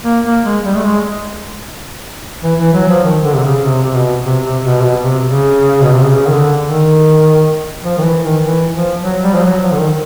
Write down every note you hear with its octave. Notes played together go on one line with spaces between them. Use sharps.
A#3
A#3
G#3
G3
A3
G#3
E3
E3
F#3
F3
D#3
D3
C3
C#3
C3
C3
B2
C3
C3
B2
C3
B2
C3
C#3
B2
C3
C#3
D#3
D3
D#3
F3
D#3
E3
D#3
E3
F3
F#3
G3
F3
F#3
F3
D3
D#3